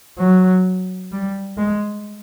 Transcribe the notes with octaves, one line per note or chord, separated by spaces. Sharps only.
F#3
G3
G#3